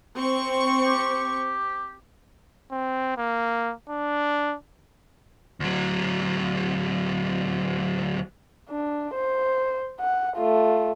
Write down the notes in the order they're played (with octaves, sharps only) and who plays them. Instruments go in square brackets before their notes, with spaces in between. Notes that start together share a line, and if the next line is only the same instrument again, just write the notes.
[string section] C4 C#6
[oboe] G4
[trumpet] C4
A#3
D4
[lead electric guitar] D2 F#3
[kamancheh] D4
C5
F#5
A3 F4